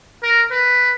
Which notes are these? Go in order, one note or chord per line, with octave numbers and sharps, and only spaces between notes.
A#4
B4